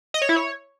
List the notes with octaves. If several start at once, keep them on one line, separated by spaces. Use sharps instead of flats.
D#5
C#5
E4
C#5